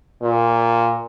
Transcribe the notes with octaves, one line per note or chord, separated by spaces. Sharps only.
A#2